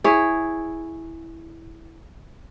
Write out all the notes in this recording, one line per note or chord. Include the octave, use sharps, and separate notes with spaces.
E4 G#4 C#5